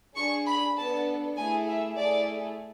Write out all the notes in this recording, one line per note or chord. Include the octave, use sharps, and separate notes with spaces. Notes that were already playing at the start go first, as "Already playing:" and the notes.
D4 G#4 C#6
B5
B3 D4 A4 A5
A3 E4 G#4 G#5
E5
A3 E4 G#4 D5